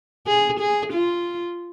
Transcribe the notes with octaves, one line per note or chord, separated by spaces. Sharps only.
G#4
G#4
F4